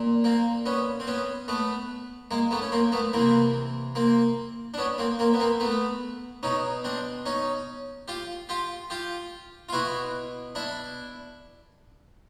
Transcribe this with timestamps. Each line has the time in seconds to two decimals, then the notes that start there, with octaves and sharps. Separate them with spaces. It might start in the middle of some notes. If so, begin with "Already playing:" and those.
Already playing: A#2
0.24 A#3 C4
0.66 B3 C#4
1.00 C4
1.07 B3 C#4
1.48 A3 B3
2.31 G#3 A#3
2.51 A3 B3
2.62 C#4
2.72 A#3 C4
2.92 A3 B3
3.13 C3 E3 A#3 C4
3.95 A#3 C4
4.74 D4
4.78 B3 C#4
4.98 A#3 C4
5.19 A#3 C4
5.33 B3
5.40 A#3 C4
5.60 A3 B3
6.43 B2 C#4 D#4
6.84 C4 D4
7.26 C#4 D#4
8.08 F4 G4
8.49 F4 G4
8.90 F4 G4
9.69 F4
9.73 B2 E4 F#4
10.55 D4 E4